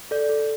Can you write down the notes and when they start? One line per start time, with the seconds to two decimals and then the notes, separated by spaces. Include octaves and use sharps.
0.11 A4 D5
0.29 A4